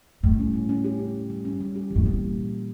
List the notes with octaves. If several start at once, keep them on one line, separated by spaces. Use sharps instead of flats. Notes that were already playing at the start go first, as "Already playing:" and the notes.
A2 G3
C#4
C#4
C#4
G4
C#4
G3
G3
C#4
G3
G4
A2 E3
A#2 G3